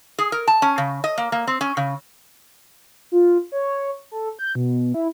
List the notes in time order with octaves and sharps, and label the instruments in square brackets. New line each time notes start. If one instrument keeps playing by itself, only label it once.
[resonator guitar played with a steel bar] G#4
A#4
A5
C#4
C#3
D#5
A#3
A#3
C4
C#4
C#3
[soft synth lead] F4
C#5
A4
G6
B2
E4